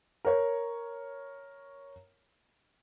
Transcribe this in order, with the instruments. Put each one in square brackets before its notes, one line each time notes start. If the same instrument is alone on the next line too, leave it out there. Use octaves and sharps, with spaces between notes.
[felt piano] A#4 C#5